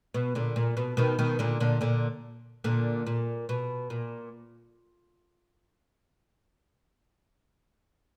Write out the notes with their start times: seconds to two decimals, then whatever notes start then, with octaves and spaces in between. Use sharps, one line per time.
0.14 B2
0.35 A#2 D3
0.56 A#2
0.77 B2
0.97 B2 D#3
1.19 B2 D#3
1.39 A#2 D3
1.60 A#2 D3
1.81 A#2 D3
2.64 A#2 D3
3.07 A#2
3.49 B2
3.90 A#2